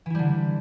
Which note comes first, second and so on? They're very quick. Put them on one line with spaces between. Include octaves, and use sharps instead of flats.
E3 E4 G3 D3